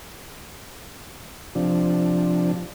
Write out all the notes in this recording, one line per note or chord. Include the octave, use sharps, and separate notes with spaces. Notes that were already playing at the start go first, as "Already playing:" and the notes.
C3 F3 D4